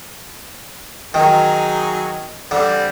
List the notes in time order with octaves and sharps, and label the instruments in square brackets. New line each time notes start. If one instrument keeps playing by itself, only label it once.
[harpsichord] D#3 [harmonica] F#3 D#4 G#4
[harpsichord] D3 [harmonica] G3 C4